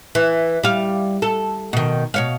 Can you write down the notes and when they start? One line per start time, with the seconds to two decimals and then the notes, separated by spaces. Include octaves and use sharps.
0.15 E3
0.63 G3 F5
1.22 A4
1.73 B2 D#3
2.14 B2 C#5 F5